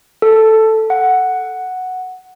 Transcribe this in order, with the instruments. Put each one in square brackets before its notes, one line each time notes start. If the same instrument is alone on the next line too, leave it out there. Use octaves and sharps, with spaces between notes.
[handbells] A4
F#5